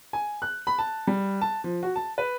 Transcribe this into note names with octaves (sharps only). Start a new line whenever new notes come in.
G#5
F#6
B5
A5
G3
A5
F3
F#4
A5
B4